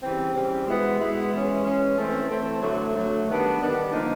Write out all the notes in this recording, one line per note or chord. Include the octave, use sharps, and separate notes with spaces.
C#3 E3 G3 C4
C#3 E3 G3 C4
B2 G#3 B3 E4
B2 G#3 B3 E4
E3 G#3 C#4
E3 G#3 C#4
E3 A3 C4 E4
E3 A3 C4 E4
D3 F#3 A3
D3 F#3 A3
D#3 G3 B3 D4
D#3 G3 B3 D4
D3 F3 A#3 D#4